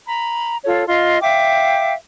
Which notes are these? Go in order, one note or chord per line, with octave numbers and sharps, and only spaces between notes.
A#5 B5
F4 A4 C#5
F4 D#5 C6
E5 F5 G5 D6